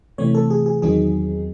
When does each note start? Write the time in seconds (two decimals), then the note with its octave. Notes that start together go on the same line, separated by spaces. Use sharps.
0.18 C3 E3 A3 C4 C#5
0.35 A4
0.50 G#4
0.66 G#4
0.82 E2 D#3 F#3 C4 D#4 G#4